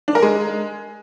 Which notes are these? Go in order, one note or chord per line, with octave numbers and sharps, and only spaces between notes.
D4
A#4
G#3